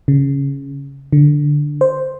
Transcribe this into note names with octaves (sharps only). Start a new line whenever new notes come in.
C#3
D3
C5